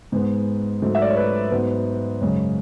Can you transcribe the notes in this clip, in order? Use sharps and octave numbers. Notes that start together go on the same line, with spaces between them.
G#2 G#3 B3
G#2 F#3 A3
E5
D5
C#5
B4
G#2 F#3 B3
F#2 C#3 G#3